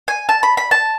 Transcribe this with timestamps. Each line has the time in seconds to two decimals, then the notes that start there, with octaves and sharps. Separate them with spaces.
0.08 G#5
0.29 A5
0.43 B5
0.57 B5
0.71 A5